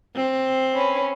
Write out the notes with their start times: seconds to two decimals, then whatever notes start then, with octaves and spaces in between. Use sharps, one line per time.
0.16 C4
0.74 C#4 B4